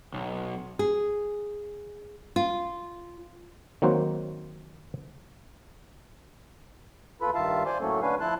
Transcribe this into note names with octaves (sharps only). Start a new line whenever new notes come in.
B1
G#4
F4
D#3 F#3 A#3 C4 F#4 C5
E2 F4 A4 B4 B5
G2 D#3 F4 E5 F5 A5
C5 D5 G#5 C6 D6
A2 F#3 A3 A#3 C#4 A4
D3 C#4 D4 B4 F5 G#5
F3 E4 A5 C6 F#6